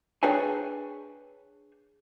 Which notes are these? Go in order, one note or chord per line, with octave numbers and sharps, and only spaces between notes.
D4 G#4 B4 C#5 G5 G#5